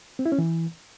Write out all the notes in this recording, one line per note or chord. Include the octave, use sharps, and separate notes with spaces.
C4
E4
C#4
E3